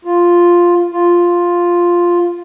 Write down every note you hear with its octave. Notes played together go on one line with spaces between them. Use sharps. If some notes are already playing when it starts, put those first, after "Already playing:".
F4
F4